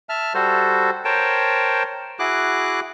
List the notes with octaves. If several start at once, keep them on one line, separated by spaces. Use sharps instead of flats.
E5 A5 F6
G3 F#4 A4 C5
A#4 C5 C#5 G5 A5
E4 F#4 G#4 D6 F#6